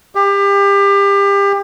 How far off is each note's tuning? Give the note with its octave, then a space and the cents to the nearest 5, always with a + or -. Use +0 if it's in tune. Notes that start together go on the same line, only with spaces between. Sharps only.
G4 +30